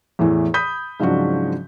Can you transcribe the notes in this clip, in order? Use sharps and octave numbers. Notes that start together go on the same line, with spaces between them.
E2 A2 E3
B5 D#6 G6 B6
G#2 C#3 F3 F#3 D4 F#4